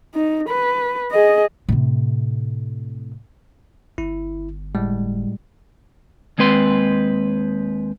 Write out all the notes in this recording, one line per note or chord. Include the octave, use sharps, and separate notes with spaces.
D#4
B4
G#4 D#5
A2 C3
G1 E4
A2 G3 G#3
D#2 G#3 C4 B4 C6